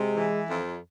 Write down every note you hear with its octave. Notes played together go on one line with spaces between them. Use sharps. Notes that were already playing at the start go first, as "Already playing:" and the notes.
Already playing: C3 G#3
E3
F2